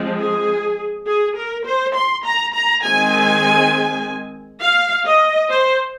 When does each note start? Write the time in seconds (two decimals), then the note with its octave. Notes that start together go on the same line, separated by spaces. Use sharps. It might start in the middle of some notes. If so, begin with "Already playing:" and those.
Already playing: F3 G#3 C4
0.18 G#4
1.07 G#4
1.36 A#4
1.66 C5
1.95 C6
2.25 A#5
2.54 A#5
2.84 D#3 G#3 C4 G#5
4.61 F5
5.06 D#5
5.50 C5